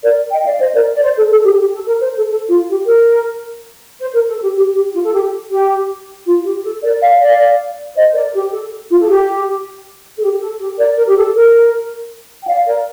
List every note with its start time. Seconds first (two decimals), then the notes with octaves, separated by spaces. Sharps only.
0.03 A#4 D5
0.31 D#5 G5
0.46 D5 F5
0.60 C5 D#5
0.74 A#4 D5
0.94 D5
1.03 C5
1.17 A4
1.31 A4
1.45 G4
1.59 G4
1.74 A4
1.88 A#4
2.02 C5
2.16 A4
2.30 A4
2.48 F4
2.68 G4
2.86 A#4
4.00 C5
4.13 A#4
4.29 A4
4.42 G4
4.56 G4
4.75 G4
4.94 F4
5.04 A4
5.13 G4
5.51 G4
6.26 F4
6.45 G4
6.63 A4
6.83 A#4 D5
7.01 D5 F5
7.20 D5 F5
7.96 C5 D#5
8.14 A#4 D5
8.34 G4
8.52 A4
8.90 F4
9.01 A4
9.09 G4
10.17 A4
10.22 G4
10.41 A4
10.60 G4
10.78 A#4 D5
10.97 A#4
11.08 G4
11.17 A4
11.35 A#4
12.44 G5
12.48 D5 F5
12.67 A#4 D5